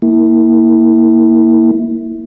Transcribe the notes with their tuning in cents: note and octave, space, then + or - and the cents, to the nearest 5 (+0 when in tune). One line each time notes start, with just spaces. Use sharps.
A#3 +0 E4 -20